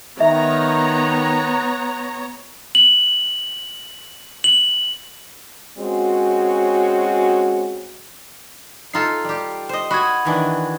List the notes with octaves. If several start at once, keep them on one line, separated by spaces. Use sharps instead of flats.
D#3 B3 C#5 E5 A#5
F#7
F#7
G#3 C4 C#4 F#4
D#4 F4 A4 A#5 C7
G3 G4
C5 D#5
F#4 B5 D#6 G#6
D#3 E3 D4